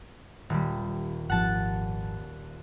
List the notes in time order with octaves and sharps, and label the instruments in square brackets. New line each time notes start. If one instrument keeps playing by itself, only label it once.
[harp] D#1 G3
[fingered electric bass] G#1 F3 [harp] F#5 A5